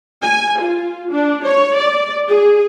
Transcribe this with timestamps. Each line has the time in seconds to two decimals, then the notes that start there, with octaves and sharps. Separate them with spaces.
0.23 G#5
0.61 F4
1.12 D4
1.44 C#5
1.77 D5
2.27 G#4